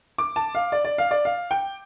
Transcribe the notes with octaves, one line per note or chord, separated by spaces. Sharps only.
D6
A5
F5
D5
D5
F5
D5
F5
G5